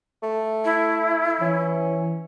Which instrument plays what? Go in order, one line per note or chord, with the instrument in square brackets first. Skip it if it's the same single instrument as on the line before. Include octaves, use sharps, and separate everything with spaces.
[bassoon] A3
[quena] E4
[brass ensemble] E3 [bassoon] C#4